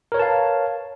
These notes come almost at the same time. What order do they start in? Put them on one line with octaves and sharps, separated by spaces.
A#4 C#5 B4 A5 F5